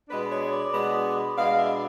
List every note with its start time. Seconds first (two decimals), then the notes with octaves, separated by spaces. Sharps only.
0.09 B2 G#3 B3 D4 B4
0.30 C#5
0.52 D5
0.72 B2 G#3 B3 D4
1.36 B2 G#3 B3 D4 F5
1.57 E5